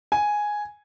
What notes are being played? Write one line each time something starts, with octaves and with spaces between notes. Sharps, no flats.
G#5